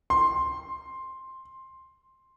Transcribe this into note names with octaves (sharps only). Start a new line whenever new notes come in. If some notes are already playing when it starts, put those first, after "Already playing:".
C6